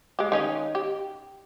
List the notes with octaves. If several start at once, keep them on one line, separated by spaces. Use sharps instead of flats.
G#3 G4
D#3 C#4 D#4
G4